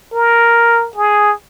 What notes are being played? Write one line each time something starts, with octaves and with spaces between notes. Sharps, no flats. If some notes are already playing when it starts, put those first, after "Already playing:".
A#4
G#4